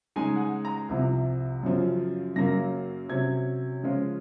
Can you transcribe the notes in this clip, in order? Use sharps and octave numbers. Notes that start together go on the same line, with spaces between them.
C#3 G#3 D#4 G#5
F#5
G#5
A#5
C2 C3 F3
F#2 C#3 F3
F#2 C#3 F#3 A#3 A#6
C3 F#3 C#4 G#6
C#3 F3 G#3 C#4 F4